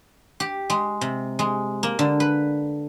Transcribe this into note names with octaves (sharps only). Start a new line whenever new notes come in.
G4
G#3
C3
G#3
A#3
D3
B4